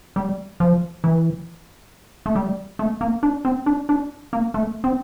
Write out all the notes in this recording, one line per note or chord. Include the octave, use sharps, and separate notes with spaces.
G3
F3
E3
A3
G3
A3
A#3
D4
C4
D4
D4
A#3
A3
C4